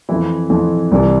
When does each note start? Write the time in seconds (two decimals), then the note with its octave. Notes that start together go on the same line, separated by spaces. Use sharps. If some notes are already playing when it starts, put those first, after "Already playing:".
0.09 F2 E3 E4
0.50 F2 E3
0.92 C2 C3 E3